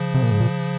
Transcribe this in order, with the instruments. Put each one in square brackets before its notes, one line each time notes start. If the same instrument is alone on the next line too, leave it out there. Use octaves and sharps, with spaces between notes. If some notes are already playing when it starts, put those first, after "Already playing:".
Already playing: [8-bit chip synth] C#3 F3
[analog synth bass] C3
A#2
G#2
A#2